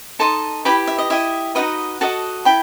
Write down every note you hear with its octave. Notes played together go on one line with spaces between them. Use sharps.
D#4 A4 D#5 A5 C6
E4 G4 B4 G5 B5
E5
D#5
E4 G4 D#5 E5
D#4 F#4 B4 D#5 F#5
F#4 A4 D#5 F#5 A5
E4 A4 G5 B5